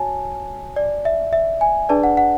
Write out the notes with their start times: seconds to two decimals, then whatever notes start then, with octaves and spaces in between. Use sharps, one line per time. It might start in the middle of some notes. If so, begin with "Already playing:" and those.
Already playing: F#4 C#5 G#5 A5
0.76 D5
1.05 E5
1.33 E5
1.61 G#5
1.89 D4 G#4 B4 D5 A5
2.04 F#5
2.17 F#5